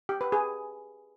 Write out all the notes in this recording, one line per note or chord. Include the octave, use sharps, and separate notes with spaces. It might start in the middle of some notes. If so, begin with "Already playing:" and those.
G4
B4
G#4